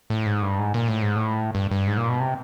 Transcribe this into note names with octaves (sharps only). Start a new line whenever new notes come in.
A2
G#2
G2
G#2
A#2
A2
G#2
A2
G2
G2
G#2
A#2
B2
C3